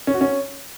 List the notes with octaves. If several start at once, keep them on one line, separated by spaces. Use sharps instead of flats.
C#4
F#4
C#4